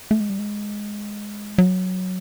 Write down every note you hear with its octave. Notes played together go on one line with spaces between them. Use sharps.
A3
G#3
G3
G#3
F#3